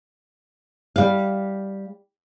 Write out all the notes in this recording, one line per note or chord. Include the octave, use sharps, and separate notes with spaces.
G3 F5